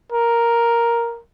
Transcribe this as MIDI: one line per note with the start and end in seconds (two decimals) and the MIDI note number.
0.12 1.21 70